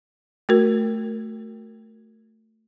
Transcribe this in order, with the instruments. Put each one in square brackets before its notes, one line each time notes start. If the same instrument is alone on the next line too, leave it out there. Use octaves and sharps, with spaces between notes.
[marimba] A3 F#4 A#4